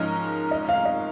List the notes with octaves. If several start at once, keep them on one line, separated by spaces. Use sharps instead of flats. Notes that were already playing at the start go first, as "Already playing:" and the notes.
Already playing: G#2 F3 C#4 A#4 D#5
D#5
F5
D#5